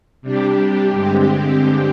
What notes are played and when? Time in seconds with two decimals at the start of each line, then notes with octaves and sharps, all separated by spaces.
0.22 C3 G3 D4 G4
0.91 G2 D3 G#3 C4 G4